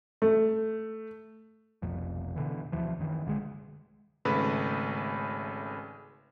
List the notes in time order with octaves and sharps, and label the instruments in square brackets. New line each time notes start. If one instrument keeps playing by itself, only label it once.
[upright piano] A3
[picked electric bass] F1 B1 F2
B2 D3 E3
D2 E3 F3
F#2 D#3 E3
B1 D3 E3 G#3
[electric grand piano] G#1 C#3 A3 B4